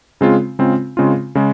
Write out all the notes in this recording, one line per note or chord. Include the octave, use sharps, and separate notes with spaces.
C#3 G#3 C4 F4
C#3 G#3 C4 F4
C#3 G#3 C4 F4
C#3 G#3